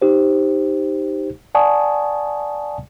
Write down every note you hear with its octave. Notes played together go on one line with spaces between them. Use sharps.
D#4 G4 C5
D5 F#5 G#5 A5 C#6 D#6